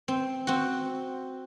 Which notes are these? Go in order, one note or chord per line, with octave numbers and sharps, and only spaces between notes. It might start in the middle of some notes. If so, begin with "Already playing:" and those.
C4
C4 F#4